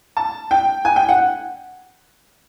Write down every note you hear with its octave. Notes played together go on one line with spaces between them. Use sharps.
A5
G5
G#5
G5
F#5